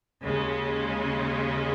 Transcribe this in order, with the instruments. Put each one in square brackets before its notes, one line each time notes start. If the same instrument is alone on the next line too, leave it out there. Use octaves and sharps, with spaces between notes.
[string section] D#2 C#3 G#3 C#4